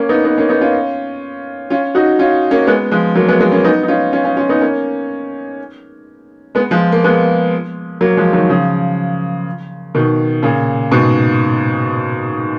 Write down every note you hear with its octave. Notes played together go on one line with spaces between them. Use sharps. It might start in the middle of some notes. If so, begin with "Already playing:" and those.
Already playing: A#3 C#4
B3 D#4
B3 D#4
A#3 C#4
B3 D#4
C#4 F4
C#4 F4
D#4 F#4
C#4 F4
A#3 C#4
G#3 B3
F3 G#3
F#3 A#3
G#3 B3
G#3 B3
A#3 C#4
B3 D#4
D#4
C#4 F4
C#4 F4
C#4 F4
C#4 F4
B3 D#4
A#3 C#4
G#3 B3
F3 G#3
A#3
G#3 B3
F#3 A#3
F3 G#3
D#3 F#3
C#3 F3
B2 D#3
A#2 C#3
G#2 B2